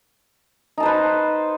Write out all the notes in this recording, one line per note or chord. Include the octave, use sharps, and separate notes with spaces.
D#4 B4 C5 A5